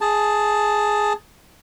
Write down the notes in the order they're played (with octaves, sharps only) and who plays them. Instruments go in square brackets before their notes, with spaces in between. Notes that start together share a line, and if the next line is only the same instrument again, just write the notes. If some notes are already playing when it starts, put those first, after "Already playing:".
[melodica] G#4 A5